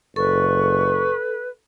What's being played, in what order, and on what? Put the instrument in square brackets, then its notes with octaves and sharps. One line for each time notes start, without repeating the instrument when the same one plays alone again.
[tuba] F#1 [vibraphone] A4 [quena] B4 [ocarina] C#6